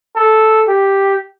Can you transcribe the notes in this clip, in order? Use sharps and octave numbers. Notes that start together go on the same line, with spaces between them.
A4
G4